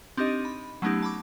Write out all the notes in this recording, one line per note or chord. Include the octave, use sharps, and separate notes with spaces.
C4 D4 D#4 G4 D#5 D#7
B5
F#3 A3 B3 C#4 D#4 G4
A5 B5 D6